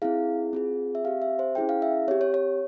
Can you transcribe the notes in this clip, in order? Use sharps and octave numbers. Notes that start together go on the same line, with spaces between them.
C4 E4 G#4 F5
C4 F4 G#4
E5
C4 G4 F5
E5
C5
C#4 E4 G#4 G5
F5
E5
C4 G4 C#5
C#5
C#5